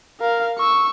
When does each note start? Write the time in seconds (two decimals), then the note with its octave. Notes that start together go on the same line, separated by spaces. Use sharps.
0.20 A#4 F5
0.59 C#6 E6